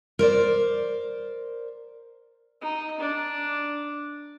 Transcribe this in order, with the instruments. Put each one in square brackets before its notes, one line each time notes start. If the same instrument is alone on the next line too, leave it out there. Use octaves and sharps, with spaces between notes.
[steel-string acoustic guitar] A#4 C5 D5
[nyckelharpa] D#4
D4